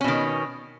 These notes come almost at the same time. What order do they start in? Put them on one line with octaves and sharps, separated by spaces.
C#4 B2 D#3